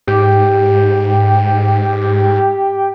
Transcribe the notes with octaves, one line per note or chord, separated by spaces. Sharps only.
G#2 G4